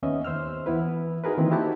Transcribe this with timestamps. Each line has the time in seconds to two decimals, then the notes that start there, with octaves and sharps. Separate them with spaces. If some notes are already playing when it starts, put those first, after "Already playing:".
0.02 D#2 B3 C#4 D#5 E5
0.25 D#2 C5 E6 F6
0.66 E3 B3 E4 B4
1.24 D#4 F#4 G#4 A#4 B4
1.37 D#3 E3 A#3 C4
1.51 D#4 E4 F#4 G4 F#5 A5